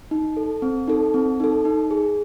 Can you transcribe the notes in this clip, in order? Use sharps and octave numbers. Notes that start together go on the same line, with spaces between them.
D#4
A4
C4
D#4 A4
C4
D#4 A4
D#4
G#4